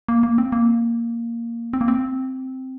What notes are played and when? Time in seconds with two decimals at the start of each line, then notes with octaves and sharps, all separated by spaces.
0.08 A#3
0.23 A#3
0.38 C4
0.52 A#3
1.73 C4
1.81 A#3
1.88 C4